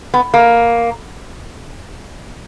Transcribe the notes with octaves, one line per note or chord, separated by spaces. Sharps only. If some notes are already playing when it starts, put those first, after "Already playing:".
B3
A#3